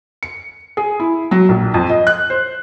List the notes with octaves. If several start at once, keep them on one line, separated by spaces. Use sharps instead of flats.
C#7
G#4
E4
F#3
A#1
F2
D#5
F#6
C5